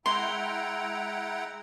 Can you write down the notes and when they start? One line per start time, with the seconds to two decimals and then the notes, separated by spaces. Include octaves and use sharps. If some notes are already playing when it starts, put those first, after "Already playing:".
0.06 G#3 E4 F#5 G5 A#5 C6